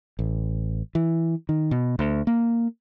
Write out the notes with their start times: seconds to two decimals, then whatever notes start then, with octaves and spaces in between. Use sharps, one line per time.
0.19 A1
0.95 E3
1.49 D#3
1.71 B2
1.99 D2
2.27 A#3